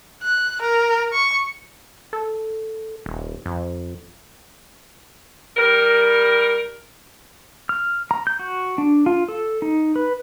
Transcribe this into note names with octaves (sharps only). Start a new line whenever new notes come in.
F#6
A#4
C#6
A4
D#1
F2
G3 A#4
F6
A#5
G6
F#4
D4
F4
A4
D#4
B4